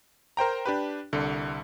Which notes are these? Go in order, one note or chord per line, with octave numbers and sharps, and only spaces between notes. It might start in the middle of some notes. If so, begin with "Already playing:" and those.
A#4 C5 G5 A#5
D4 G4 B4
C2 D3